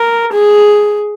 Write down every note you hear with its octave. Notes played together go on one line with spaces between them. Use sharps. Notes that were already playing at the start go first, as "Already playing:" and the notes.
Already playing: A#4
G#4